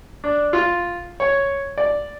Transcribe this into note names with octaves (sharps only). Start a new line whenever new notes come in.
D4
F4
C#5
D5